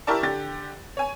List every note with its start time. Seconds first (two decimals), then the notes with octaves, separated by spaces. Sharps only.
0.07 E4 G4 A#4 D5 A5 C#6
0.23 D3 G4 A6
0.97 C#5 G#5